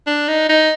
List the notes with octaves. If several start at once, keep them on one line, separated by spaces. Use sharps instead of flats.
D4
D#4
D#4